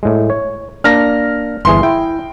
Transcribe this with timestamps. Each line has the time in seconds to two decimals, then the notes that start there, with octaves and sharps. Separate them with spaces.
0.03 A2 G#3
0.30 C#5
0.84 A#3 D4 F6 A#6
1.65 G1 E3 G#4 C6
1.83 E4 G5